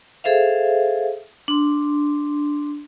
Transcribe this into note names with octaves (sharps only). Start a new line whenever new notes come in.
G#4 A4 C5 E5 F5
D4 C6